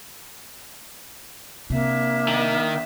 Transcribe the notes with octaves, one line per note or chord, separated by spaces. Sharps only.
C3 A#3 D4 E5
D#3